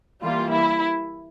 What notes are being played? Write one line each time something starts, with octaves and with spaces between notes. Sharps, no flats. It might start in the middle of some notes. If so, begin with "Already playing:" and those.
E3 G3 A#3 F4
E4